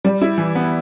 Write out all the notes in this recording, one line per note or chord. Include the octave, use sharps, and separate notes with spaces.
G3
E4
E3
B3